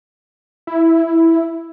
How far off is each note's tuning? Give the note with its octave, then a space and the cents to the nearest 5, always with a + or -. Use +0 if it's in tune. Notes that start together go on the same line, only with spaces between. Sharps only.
E4 +0